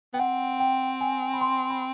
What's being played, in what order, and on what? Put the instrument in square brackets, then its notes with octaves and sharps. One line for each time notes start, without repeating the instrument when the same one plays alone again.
[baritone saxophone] B3 [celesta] G5
[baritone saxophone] C4 [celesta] F#5
[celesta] G5
G#5
B5
C6
B5